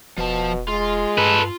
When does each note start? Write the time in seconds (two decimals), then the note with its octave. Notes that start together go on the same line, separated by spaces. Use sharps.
0.18 E1 B2 F3 A5
0.68 G#3 F4
1.18 G2 A4 B4